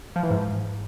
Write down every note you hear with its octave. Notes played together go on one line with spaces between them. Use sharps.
F3
E3
G#2